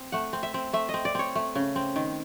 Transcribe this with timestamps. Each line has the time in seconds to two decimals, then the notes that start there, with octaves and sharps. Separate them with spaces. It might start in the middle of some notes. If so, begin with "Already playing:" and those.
Already playing: C4
0.12 A3 F#5
0.33 C4
0.43 E5
0.54 C4
0.73 A3 E5
0.89 D#5
0.94 C4
1.05 D5
1.15 C4 C#5
1.35 A3
1.55 C#3
1.76 C4
1.96 D#3